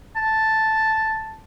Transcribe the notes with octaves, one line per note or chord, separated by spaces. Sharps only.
A5